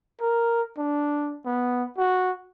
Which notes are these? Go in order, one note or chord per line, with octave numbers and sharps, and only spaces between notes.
A#4
D4
B3
F#4